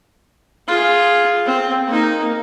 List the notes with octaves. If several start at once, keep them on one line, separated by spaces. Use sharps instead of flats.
F4 G#4
C4
A#3 D#4